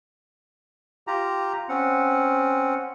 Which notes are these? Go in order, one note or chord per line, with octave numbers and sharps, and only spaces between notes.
F4 G4 A#5
C4 C#4 F#5